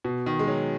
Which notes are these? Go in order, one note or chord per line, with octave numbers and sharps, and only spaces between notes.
B2
D#3
G#3
F#3